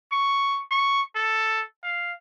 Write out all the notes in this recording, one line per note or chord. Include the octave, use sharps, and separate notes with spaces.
C#6
C#6
A4
F5